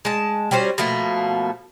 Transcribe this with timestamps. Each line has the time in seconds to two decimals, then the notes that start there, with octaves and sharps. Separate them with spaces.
0.05 G#3 A5
0.51 G3 C#4 F#4 C5
0.78 B2 F3 A3 A#3